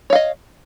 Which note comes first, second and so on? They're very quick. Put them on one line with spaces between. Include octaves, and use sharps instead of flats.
C#5 F5 D#5